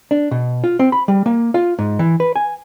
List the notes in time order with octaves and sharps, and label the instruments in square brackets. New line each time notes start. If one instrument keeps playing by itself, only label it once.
[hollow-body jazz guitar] D4
B2
F4
C4
B5
G3
A#3
F4
G#2
E3
B4
G#5